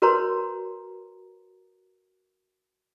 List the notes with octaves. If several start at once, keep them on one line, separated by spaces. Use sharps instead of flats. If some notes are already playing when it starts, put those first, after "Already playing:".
F#4 A#4 B4 C#5 A#5 C6